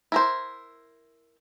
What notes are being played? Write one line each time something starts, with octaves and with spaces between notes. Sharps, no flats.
E4 A#4 C5